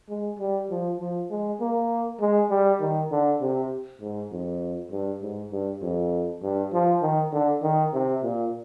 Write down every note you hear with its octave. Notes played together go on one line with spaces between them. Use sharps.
G#3
G3
F3
F3
G#3
A#3
G#3
G3
D#3
D3
C3
G#2
F2
G2
G#2
G2
F2
G2
F3
D#3
D3
D#3
C3
A#2